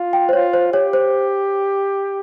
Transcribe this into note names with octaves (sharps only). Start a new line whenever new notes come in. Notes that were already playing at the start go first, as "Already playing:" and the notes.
Already playing: F4
G5
C5
F4 C#5
C5
G4 C#5
C5